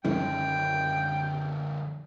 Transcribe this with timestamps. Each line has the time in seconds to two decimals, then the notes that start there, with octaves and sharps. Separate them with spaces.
0.05 F#2 D3 D#3 F3 C#4 G5